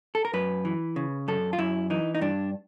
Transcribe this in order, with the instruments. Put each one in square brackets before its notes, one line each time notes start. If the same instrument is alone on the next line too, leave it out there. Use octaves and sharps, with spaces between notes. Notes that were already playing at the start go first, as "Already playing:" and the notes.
[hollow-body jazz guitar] A4
A#4
F#2 B4
E3
C#3
F#2 A4
F4
F#2 E4
E3 D#4
D#4
G2 D4